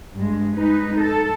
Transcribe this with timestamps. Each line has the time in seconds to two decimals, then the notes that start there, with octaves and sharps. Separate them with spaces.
0.14 G2 G#3
0.56 G#3 D#4 B4
0.98 A4